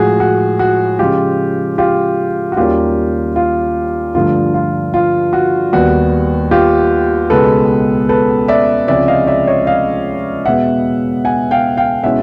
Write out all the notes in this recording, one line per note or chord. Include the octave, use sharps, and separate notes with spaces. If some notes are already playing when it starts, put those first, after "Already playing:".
Already playing: A2 F3 G#3 F#4 G#4
F#4
F#4
C#3 F3 G#3 F4 G4
F4 G4
F#4
D#2 D#3 G3 A#3 C#4 F4 G4
F4
G2 D3 F3 A3 F4
F4
F4
F#4
D#2 D#3 G3 B3 F#4
F4 G4
C#2 B2 G#3 B3 A4 B4
A4 B4
D5 E5
C#2 C3 F3 G#3 C#4 D5 E5
D#5 F5
D5 E5
C#5 D#5
D#5 F5
E2 B2 G#3 B3 E5 F#5
F#5 G#5
F5 G5
F5 G5
B2 G#3 C#4 E4 E5 F#5